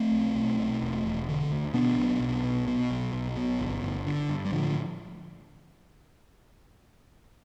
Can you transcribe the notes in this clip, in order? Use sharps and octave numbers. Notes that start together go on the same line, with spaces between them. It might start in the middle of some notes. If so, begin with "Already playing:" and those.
Already playing: A3 C4
B1
B1
B2
E1
E1
D3
D2
B2 B3 D4
B1
B1
B2
B2
B1
B1
B2
G1
G1
D3
G2
G3
A2 D3 F3